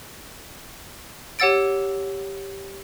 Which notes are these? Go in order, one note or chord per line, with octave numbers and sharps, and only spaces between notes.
G4 C#5 F#5 E6 A6 D7